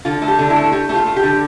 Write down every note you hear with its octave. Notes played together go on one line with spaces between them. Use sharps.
D3 F4
A3
G4
D3 D4
E4
A3
A3 G4
A3 G4
F4
A3
G4
D3